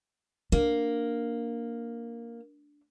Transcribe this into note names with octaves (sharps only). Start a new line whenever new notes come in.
A#3 D4